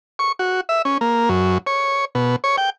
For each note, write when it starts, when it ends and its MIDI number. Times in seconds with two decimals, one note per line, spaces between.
0.19 0.32 85
0.39 0.61 66
0.69 0.82 76
0.85 0.98 61
1.01 1.29 58
1.29 1.58 42
1.67 2.05 73
2.15 2.36 47
2.44 2.56 73
2.58 2.70 79